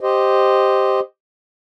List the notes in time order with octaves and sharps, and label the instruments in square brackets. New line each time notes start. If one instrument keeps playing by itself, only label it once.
[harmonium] G4 C5 D#5